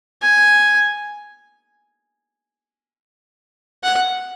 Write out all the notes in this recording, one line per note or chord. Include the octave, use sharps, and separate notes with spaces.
G#5
F#5